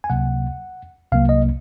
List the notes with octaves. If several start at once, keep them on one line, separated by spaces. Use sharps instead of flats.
G#5
C#2 C3 F#3 A#3 F#5
C2 C3 F#3 A#3 F5
D#5